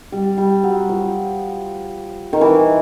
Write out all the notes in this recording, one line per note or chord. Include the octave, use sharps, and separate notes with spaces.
G3
G3
F#3
F3
D#3
E3